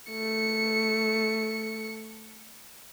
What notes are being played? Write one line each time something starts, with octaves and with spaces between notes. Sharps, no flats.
A3 C#7